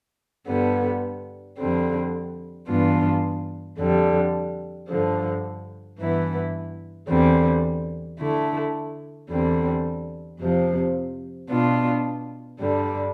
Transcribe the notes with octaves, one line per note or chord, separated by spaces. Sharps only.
G2 D3 G3 B3
F2 D3 G3 C4
G2 E3 B3 D4 F4
F2 D3 G3
G2 D3 F3
G2 E3 B3 E4
E2 D3 G3 C4
D3 A3 E4
E2 D3 G3 C4
F2 C3 F3
B2 B3 D4 F4
G2 D3 G3 D4